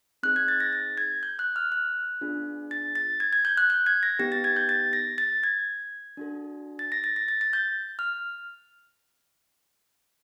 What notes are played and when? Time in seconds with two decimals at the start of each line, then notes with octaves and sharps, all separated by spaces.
0.23 C4 D#4 G#4 F#6
0.36 G#6
0.48 A6
0.60 A#6
0.73 A6
0.97 G#6
1.23 G6
1.39 F#6
1.56 F6
1.72 F#6
2.21 B3 D4 F4 G#4
2.71 A6
2.95 A6
3.20 G#6
3.33 G#6
3.45 G6
3.58 F#6
3.70 G6
3.86 G#6
4.03 A#6
4.19 B3 D#4 G4 A#6
4.32 A6
4.44 G#6
4.56 G6
4.69 A6
4.93 A#6
5.18 A6
5.44 G#6
6.17 D4 F#4 A4
6.79 A6
6.92 A#6
7.04 A6
7.16 A#6
7.28 A6
7.41 A6
7.53 G6
7.99 F6